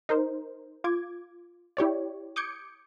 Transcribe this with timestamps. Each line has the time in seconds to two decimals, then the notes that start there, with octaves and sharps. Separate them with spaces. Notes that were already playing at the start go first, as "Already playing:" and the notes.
0.09 D#4 A#4 C5
0.84 F4 D6 G#6
1.77 E4 G4 C#5 D5
2.36 D6 D#6 G6 G#6 C#7 D7